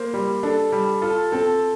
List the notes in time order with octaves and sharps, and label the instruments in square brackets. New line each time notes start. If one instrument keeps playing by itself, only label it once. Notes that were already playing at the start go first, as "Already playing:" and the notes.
Already playing: [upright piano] A#3 [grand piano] C5
[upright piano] G3
[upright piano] D4 [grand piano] A4
[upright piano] G3
[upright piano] F4 [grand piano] A4
[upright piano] C4 [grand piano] A4